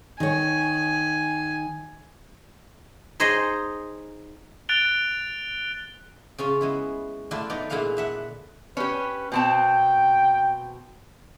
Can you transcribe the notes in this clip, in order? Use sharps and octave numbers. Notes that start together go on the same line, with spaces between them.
D#3 C#5 G#5
D#4 G#4 C5 C#5 D#5
F#6 A6 D7 F7 G7
C#3 C#4 F4
G#3 B3 E4
D3 A3 D4 E4 F4
B3 D#4 D5
A#2 D3 E4 G#4 F5 F#5
D4 E5 F#5
C#4 G4 B4
B2 C4 G5 A5